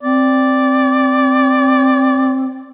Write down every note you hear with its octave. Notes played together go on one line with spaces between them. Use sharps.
C4 D5